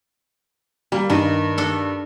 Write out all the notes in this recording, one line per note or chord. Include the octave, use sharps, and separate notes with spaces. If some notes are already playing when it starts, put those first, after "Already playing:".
G3 A#3
G2 D#3
D4 A4